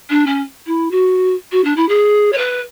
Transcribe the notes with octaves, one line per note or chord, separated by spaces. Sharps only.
D4
C#4
E4
F#4
F#4
D4
E4
G#4
C#5
B4